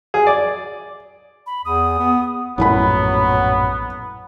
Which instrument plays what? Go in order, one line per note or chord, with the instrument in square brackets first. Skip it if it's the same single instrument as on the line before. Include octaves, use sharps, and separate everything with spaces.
[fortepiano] G#4
D5
[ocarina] B5
[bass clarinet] E2 [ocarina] D#6
[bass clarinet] B3
[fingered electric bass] A#1 F#2 A2 [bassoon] F#3 [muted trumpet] B3 [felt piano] E4 B5